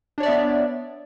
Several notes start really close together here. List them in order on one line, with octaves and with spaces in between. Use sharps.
D4 C#5 D5 E5 B3